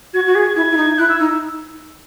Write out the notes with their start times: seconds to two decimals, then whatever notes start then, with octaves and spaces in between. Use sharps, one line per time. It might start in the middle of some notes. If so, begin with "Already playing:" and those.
0.13 F#4 G#6
0.26 F#4
0.35 G#4
0.56 E4 G#6
0.71 E4
0.77 D#4
0.98 E4 F#6
1.08 E6
1.19 D#4 E6